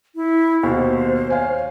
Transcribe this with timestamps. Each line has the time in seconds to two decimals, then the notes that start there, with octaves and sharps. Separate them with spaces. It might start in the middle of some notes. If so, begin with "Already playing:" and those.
0.16 E4
0.63 D#2 B2 C5
1.30 C#5 F5 G#5